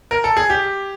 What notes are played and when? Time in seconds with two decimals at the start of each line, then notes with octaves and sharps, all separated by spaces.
0.11 A#4
0.24 A4
0.37 G#4
0.50 G4